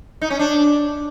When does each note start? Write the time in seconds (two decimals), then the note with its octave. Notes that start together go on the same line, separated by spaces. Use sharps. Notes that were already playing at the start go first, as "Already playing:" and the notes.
0.21 D#4
0.30 C#4
0.39 D4